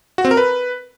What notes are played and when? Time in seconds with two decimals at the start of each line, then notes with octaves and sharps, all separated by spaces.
0.18 F#4
0.25 C4
0.31 A#4
0.37 B4